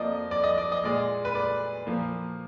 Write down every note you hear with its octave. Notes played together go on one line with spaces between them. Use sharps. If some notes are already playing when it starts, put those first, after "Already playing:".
Already playing: F2 F3 A#3 D5 D#5
D5
D#5
D5
D#5
A#2 G#3 D5
B4
D5
A#2 F3 A#3